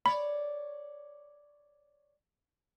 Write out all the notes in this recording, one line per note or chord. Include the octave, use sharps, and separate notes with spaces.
C#5 D5 B5